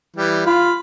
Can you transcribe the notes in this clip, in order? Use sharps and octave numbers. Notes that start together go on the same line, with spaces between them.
E3 G3
F4 F5 B5